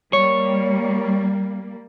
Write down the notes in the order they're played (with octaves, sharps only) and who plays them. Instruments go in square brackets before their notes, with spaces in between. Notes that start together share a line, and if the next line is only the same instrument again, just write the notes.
[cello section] G3 A#3 [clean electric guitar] C#5